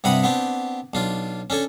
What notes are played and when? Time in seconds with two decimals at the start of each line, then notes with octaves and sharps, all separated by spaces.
0.04 G2 C3 E4 F#5 B5 D#6
0.24 B3 C4 D4 G4
0.94 B1 D4 F4
1.50 C#4 D4 A4 G#5